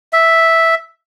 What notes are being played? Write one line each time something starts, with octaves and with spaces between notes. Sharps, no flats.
E5